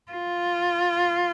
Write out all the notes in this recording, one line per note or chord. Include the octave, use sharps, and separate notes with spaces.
F4